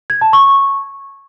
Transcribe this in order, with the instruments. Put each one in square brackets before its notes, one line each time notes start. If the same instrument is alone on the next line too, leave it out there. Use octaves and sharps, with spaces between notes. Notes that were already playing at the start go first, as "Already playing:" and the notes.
[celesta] G#6
A5
C#6